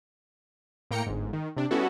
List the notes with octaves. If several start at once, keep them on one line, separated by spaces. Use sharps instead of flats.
A2 A#3 G5 A#5 C#7
G1 G#2
D#3
C3 D4
G3 B3 C#4 E4 F#4 A4